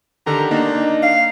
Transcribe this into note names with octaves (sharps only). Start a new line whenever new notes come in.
D3 D#3 G4 A#5
A#3 D4 D#4
F5